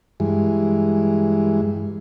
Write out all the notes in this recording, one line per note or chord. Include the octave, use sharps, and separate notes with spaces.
G2 E3 G#3